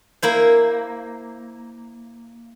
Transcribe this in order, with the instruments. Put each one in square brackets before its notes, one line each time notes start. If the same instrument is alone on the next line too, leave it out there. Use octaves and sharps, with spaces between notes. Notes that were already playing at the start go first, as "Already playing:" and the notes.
[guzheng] A#3 E4 C5